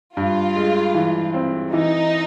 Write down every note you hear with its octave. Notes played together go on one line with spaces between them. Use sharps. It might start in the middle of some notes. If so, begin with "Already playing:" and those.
G2 F4
G#3
E3
C4
E3 D#4